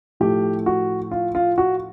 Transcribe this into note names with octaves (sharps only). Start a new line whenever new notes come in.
A2 F3 A3 G4
F#4
F4
F4
F#4